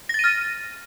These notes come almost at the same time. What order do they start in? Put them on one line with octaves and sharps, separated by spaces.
A#6 A6 D#7 F6